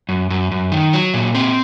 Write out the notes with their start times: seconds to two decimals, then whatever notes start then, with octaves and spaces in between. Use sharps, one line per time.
0.09 F#2
0.30 F#2
0.51 F#2
0.72 D#3
0.93 F#3
1.14 A#2
1.35 C4